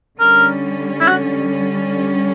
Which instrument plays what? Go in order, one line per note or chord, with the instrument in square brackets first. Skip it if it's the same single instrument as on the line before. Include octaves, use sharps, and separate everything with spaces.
[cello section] D3 G3 C#4 [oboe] A#4
[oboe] E4
F#4